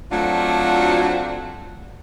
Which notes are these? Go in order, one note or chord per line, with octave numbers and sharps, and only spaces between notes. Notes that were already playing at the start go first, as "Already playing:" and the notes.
F#3 A3 C4 D4 F4 F#4